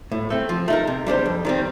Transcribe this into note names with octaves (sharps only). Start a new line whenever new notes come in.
A2
A3 C4
F3
A3 D#4 A#4
C3
G3 D4 A4 C5
F2
D#3 G3 C4